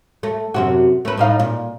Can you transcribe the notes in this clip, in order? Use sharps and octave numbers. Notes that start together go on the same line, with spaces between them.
A3
F#2 C3 F#4
A3 B4
A2 D#4 F5
A#2